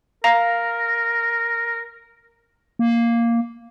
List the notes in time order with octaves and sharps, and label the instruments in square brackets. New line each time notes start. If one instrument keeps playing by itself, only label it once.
[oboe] A#4 [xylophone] F5 A#5 A#6
[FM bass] A#3